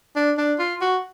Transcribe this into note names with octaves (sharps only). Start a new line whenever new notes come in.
D4
D4
F4
F#4